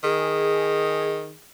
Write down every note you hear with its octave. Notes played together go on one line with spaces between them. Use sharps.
D#3 G#4